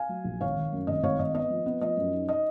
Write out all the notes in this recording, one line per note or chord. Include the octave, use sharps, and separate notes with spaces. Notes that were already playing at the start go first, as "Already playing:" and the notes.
Already playing: F5 G#5
F#3
A#1
G#1 C#5 F5
D#3
F#2
G#1 D#5
G#1 C#5 F5
G#1 D#5
B3 D#5
F3
B3
F3 D#5
F#2
D#4
D#5